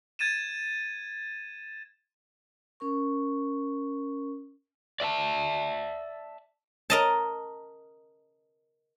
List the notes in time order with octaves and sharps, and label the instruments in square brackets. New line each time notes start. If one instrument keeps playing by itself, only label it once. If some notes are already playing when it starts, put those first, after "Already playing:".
[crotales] G#6 A6 D#7 E7
[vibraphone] C#4 A#4 C#6
[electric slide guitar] D5 E5 G#5 A5
[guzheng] A#4 D#5 A5